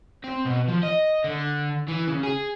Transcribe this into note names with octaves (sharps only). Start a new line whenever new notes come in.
C4
B2
F3
D#5
D3
E3
C#3
G#4